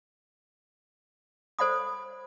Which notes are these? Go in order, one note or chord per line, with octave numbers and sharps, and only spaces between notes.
A4 C5 D5 F#5 B5 D#6